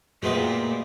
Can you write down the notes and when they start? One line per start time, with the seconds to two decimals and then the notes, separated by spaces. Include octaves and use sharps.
0.23 F#2 A#2 G#3 A3 B3 G4